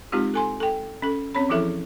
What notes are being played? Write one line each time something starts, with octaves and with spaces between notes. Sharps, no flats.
G#3 C4 D#4 F4 G4
A4 G#5 C6
A4 G5
C#4 A4
C4 C#4 C#5 B5
E3 F3 E4 G#4 A4 E5